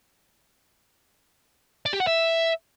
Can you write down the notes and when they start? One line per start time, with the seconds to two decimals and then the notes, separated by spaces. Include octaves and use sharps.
1.86 D5
1.93 G4
2.00 F#5
2.07 E5